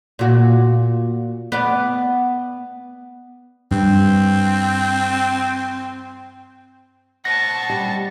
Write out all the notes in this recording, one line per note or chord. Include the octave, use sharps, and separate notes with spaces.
A#2 F#4
B3 D5
G2 C4
C5 D#5 F#5 A5 C#6 A#6
G3